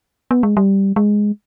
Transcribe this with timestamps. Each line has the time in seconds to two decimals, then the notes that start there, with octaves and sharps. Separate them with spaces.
0.31 B3
0.43 G#3
0.57 G3
0.96 G#3